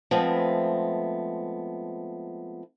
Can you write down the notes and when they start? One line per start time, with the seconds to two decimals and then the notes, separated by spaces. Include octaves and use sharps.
0.11 F3 G#3 A3 B3 C4